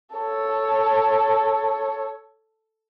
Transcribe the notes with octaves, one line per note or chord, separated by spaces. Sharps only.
A4 C#5